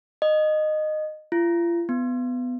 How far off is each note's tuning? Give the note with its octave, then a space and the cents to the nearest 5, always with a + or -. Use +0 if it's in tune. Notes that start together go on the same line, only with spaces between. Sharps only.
D#5 -15
F4 -40
B3 +15